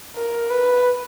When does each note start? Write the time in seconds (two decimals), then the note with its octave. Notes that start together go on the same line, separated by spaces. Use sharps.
0.16 A#4
0.50 B4